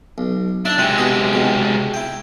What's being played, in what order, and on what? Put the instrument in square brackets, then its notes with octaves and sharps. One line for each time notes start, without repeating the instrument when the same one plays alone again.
[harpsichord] B1
[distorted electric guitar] D4 [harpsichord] E4 E5
[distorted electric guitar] C3 G#3 [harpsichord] C4 E4
[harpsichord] B2 G4 G#4
G#2 B2
E4 G5